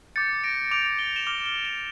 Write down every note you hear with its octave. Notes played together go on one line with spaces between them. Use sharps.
D6 G6 A6 C#7
A#6 D7
D6 G6 D7 F7
G7
E7 G7
D6 F6 G7
G7
E7 G7